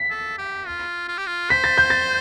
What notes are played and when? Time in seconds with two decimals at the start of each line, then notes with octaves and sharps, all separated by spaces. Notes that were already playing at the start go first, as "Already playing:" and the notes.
Already playing: B6
0.10 A4
0.38 G4
0.67 F4
1.08 F4
1.18 G4
1.27 F4
1.50 C5 B6
1.64 A6
1.78 G6
1.90 A6